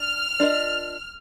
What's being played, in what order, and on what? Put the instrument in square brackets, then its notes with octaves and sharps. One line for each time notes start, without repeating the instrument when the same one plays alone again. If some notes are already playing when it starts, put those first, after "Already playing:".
Already playing: [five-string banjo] D4 [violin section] F6
[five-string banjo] D4 F4 A#4 D#5